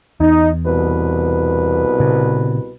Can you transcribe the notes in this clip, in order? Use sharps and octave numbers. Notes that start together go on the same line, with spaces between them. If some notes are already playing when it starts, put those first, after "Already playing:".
E2 D#4
C2 B2 B4
A#2 C#3 B3